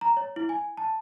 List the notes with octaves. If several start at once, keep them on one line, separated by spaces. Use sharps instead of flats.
A#5
C#5
E4
G#5
A5